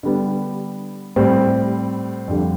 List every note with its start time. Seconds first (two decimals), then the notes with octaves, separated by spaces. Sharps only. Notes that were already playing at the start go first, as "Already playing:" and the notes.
0.03 D3 G3 B3
1.16 A2 G3 C4
2.28 F2 D3 G3